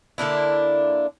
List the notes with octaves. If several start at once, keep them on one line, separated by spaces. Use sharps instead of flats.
D3 A#3 D4 E4